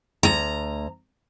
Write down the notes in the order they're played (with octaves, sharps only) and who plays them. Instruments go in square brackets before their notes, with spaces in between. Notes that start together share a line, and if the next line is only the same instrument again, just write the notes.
[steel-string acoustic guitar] D2 A#5